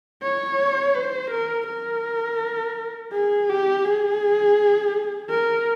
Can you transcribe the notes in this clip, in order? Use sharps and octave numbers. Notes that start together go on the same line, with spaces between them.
C#5
C5
A#4
A#4
G#4
G4
G#4
A#4